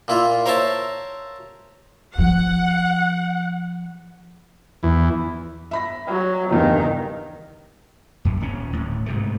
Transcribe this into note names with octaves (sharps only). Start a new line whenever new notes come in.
A#2 E4 F4
A#4 C5 C#5 E5 A5
F3 F#5
E2
E5 B5 A#6
F#3
F#1 E2 G2 D#3
F#2
D#1 C#4
D1 A2
G#2 C3 A3